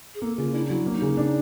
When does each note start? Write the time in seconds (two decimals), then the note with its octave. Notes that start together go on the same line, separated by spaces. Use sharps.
0.14 G#4
0.22 A#3 A4
0.38 C#3 F4
0.53 D4 E4
0.66 D#4
0.69 F#3 E4
0.86 A#3
0.94 D#4
1.02 C#3
1.17 D4